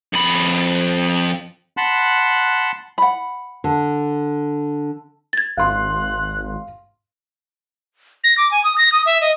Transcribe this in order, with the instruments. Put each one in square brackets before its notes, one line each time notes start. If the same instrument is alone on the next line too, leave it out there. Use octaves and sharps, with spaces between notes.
[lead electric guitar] F2 B5
[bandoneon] F#5 A5 B5 C6 F#6
[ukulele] F#5 B5
[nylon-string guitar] D3
[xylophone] G#6 A6
[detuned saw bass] G#1 [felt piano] F5 C6 [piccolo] F#6
[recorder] A#6
D6
G#5
D#6
A#6
D#6
E5
D#5